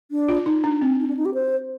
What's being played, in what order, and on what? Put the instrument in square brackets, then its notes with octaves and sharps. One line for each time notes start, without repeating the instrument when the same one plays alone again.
[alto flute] D4
[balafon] F4
D#4
D4
C4
[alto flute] D#4
D4
D#4
G4
C5